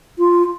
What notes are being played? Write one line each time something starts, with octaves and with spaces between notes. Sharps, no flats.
F4